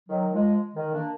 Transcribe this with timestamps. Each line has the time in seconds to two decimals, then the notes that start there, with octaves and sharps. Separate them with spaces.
0.09 D#3 F#3
0.33 F3 G#3
0.75 D#3
0.93 A#3 D4